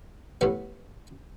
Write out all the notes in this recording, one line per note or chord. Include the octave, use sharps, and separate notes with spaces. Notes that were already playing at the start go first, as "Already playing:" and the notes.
A2 G3 B3